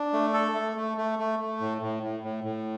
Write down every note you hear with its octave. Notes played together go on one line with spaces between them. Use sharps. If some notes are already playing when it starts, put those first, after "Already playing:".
Already playing: D4
A3
A4
A3
A3
A3
A3
A3
A2
A2
A2
A2
A2